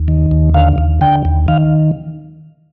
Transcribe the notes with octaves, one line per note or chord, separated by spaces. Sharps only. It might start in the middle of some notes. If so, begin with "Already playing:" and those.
Already playing: D#2
D#3
D#2
D3 F5
D#2
D3 G5
D#2
D#3 F5